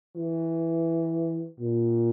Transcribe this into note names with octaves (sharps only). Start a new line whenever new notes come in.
E3
A#2